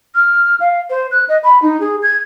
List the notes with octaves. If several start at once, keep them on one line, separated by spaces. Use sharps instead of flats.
F6
F5
C5
F#6
D#5
B5
D#4
G#4
G#6